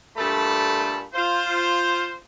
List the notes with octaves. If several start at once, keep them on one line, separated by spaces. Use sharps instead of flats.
G2 A#2 A3 A4 A5 B5
F4 C5